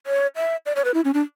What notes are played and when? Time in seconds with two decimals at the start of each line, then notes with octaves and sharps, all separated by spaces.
0.07 C#5
0.36 E5
0.66 D5
0.76 C#5
0.85 B4
0.94 E4
1.05 C#4
1.14 D4